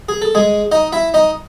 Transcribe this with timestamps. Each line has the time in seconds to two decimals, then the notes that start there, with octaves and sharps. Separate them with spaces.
0.09 G#4
0.22 A4
0.35 G#3 G#4
0.72 D#4 D#5
0.92 E4 E5
1.14 D#4 D#5